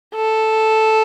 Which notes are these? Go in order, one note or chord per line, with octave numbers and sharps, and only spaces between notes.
A4